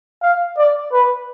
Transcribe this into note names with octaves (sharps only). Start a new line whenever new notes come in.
F5
D5
B4